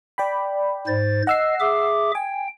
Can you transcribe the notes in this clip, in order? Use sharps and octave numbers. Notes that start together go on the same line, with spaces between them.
D5 G5 B5
G#2 C5 A6
D#5 F#5 E6 C7
G#4 E5 D6
G5 G#5